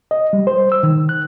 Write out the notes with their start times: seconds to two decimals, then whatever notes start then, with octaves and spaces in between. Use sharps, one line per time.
0.11 D#5
0.33 G3
0.47 C5
0.72 E6
0.83 D#3
1.09 F#6